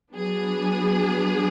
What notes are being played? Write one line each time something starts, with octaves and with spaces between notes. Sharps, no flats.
F#3 B3 D4 G#4